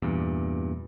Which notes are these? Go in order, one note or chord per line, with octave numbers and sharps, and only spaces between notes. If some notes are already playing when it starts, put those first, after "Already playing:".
E2 G2 A#2